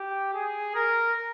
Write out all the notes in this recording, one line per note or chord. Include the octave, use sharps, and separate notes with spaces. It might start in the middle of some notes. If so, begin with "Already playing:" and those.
Already playing: G4
G#4
A#4